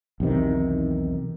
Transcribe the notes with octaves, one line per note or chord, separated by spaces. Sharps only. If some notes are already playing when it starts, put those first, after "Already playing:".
B1 E2 C3 D#3